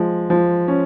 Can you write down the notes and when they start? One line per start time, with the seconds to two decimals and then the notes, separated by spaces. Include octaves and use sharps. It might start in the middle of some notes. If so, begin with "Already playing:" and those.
Already playing: F3 G#3
0.30 F3
0.68 C#4